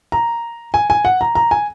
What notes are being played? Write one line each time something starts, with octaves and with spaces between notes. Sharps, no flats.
A#5
G#5
G#5
F#5
A#5
A#5
G#5